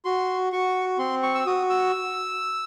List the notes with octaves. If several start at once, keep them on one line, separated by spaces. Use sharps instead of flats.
F#4 C6
F#4 C#6
C4 C6
C#6
E6
F#4 D#6
E6